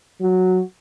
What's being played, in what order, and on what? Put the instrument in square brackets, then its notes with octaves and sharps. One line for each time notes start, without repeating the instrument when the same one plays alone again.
[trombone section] F#3 F#4